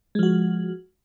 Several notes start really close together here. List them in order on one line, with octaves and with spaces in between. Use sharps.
G#3 F3 F#4